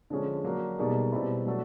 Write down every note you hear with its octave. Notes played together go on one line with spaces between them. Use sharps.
D3 F3 G#3 C#4
F#3 A#3 D4
B2 G3 A#3 D#4 G#4
B2 G3 C4 E4
F#3 A3 D4 F#4 A4